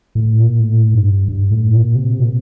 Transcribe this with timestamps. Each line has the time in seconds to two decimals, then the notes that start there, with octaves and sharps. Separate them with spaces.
0.15 A2
0.38 A#2
0.60 A2
0.93 G2
1.28 G2
1.51 A2
1.73 A#2
1.95 C3
2.19 A#2